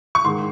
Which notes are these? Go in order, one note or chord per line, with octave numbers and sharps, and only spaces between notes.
C#6
G#2 D#3 G#3 C6